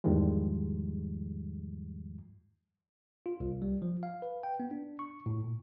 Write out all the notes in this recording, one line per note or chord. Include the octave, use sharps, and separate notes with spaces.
E2 G#2 D#3 F3 G3 G#3
F4
C2
G3
F3
F5
B4
G5
B3
D4
C#6
A2
A#2